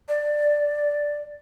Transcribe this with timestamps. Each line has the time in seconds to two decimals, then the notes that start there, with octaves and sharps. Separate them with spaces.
0.08 D5